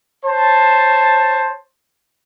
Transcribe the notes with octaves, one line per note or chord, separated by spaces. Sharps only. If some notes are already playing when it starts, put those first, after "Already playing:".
C5 C#5 A5